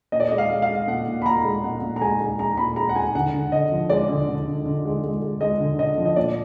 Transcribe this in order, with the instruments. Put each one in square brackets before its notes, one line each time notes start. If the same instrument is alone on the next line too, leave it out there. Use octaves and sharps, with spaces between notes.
[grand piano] A#2 D#5
D5
D#5
G#3
F5
G#3
F5
G#3
A#2 F#5
A#2
B5
A#2 A#5
G#3
A#2 F#5
A#2
A#5
G#3 G#5
G#3
G#3 A#5
A#2 B5
G#3 A#5
F#5
G#3 G#5
D3 F#5
D3
D3 D#5
F3
G#3 D5
D3
D3
D3
D3
G#3
G#3
G#3
G#3 D#5
D3
D3 D#5
F3
D#5
A#2 D5